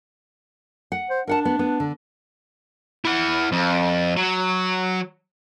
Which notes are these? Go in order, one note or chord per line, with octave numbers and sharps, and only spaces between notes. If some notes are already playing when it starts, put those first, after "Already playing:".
F#5
C5
D4 A#4 F#5 A5
B3
B3
D3
E4 F#5
F2
F#3